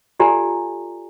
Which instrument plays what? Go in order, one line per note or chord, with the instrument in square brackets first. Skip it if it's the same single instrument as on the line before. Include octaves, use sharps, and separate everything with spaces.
[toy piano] F4 G4 A4 D5 G#5 A#5